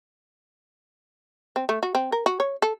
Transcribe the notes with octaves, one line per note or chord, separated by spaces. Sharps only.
C4
A3
F#4
C4
A#4
F#4
C#5
A4